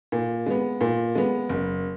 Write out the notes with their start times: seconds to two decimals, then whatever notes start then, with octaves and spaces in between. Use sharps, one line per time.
0.12 A#2
0.46 G#3 B3
0.81 A#2
1.15 G#3 B3
1.49 F#1